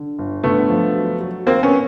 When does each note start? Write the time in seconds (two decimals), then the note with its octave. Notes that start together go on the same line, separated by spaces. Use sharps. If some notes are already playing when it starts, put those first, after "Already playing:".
Already playing: D3
0.19 G1
0.44 D3 A3 B3
0.69 F3
0.95 F#3
1.20 F#3
1.47 D#2 A#3 C4
1.63 B3 C#4